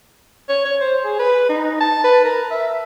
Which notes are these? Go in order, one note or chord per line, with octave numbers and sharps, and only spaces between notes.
C#5
C#5
C5
G#4
B4
D#4
A5
B4
A#4
E5